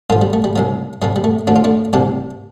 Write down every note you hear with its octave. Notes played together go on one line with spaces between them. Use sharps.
G2 F3 F4 A4
G3
A3
G3
C2 C3 F3
F2 C3 F3 G3
G3
A3
D2 D3 F3 D4
F4
A3 D4
C2 C3 F3 D4 G4